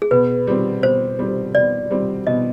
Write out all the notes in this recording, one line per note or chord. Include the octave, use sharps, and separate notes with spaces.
G#4
B2 B4
G3 C4
B2 C5
G3 C4
B2 D5
G3 C4
B2 D#5